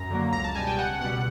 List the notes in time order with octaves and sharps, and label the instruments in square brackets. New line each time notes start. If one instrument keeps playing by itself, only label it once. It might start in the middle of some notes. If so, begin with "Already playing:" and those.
Already playing: [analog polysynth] F#2 A#5
D3 F#3 A#3
C#2 A#5
A5
B2 G3 G#5
G5
C#2 F#5
B2 G3 F#5